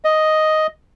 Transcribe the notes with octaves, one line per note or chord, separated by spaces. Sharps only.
D#5